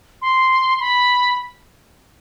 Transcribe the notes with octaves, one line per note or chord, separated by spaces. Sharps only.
C6
B5